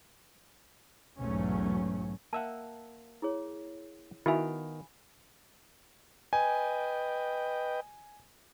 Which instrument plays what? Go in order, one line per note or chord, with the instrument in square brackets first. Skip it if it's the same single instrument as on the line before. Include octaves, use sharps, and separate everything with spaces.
[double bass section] B1 E2 G#2 F#3 A3 C#4
[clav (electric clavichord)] A#3 E5 F#5 [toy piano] A5 E6
[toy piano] E4 G#4 C#5
[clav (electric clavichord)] D#3 B3 [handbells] E4 F#4 E5 [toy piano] F5 G#5 B5
[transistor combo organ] B4 D#5 G5 [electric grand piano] G#5